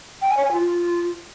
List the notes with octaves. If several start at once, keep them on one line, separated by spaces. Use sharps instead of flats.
G5
G#5
C#5
G#5
F4